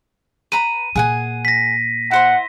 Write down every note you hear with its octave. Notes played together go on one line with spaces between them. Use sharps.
B4 A#5 B5 D#7
A#2 G#4 F#5 G#5
A#6 B6
E4 C5 F#5 C6